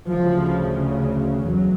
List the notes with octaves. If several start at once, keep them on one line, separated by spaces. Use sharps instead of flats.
D2 C#3 F3
E2 F#3